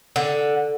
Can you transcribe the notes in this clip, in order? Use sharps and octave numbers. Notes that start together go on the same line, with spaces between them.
D3